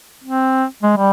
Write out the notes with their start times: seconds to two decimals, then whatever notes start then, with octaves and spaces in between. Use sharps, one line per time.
0.24 C4
0.83 G#3
0.97 G3